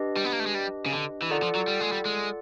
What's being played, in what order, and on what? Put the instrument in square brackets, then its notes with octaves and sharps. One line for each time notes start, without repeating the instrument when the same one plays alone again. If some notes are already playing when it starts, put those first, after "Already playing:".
Already playing: [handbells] D4 G4 B4 D#5
[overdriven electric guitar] G3
B3
A#3
A3
G#3
G3
C#3
D3
E3
[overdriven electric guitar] D#3 [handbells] F4 A4 D5 F#5
[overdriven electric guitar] F3
F#3
G3
G#3
G3
G#3